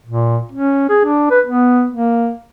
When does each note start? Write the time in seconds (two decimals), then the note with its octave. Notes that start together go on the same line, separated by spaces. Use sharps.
0.06 A#2
0.52 C#4
0.89 G#4
1.05 D4
1.31 B4
1.46 B3
1.90 A#3